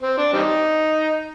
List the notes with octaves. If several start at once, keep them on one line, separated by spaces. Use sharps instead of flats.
C4
D4
G3 C4 D#4